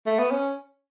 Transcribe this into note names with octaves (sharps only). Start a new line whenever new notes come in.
A3
B3
C#4